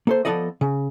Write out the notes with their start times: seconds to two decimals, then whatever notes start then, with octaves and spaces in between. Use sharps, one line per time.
0.07 A#3 A4 C5
0.25 F3 A#3 B3 A4 D5 D#5
0.61 C#3